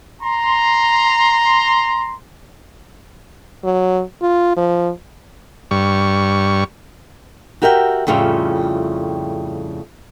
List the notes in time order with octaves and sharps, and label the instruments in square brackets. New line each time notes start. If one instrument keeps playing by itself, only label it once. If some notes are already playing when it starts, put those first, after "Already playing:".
[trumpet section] A#5 C6
[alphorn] F#3
F4
F3
[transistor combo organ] G2 C#6
[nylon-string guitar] F#4 G4 A#4 E5 F5 G5
F2 A2 C#3 G3 F4 E5